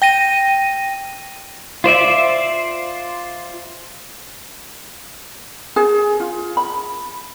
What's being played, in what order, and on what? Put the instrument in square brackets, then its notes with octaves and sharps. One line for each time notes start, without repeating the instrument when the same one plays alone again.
[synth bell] G5 A#6 D#7
[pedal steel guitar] F4 C5 D5 E5
[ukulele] G#4
F4
B5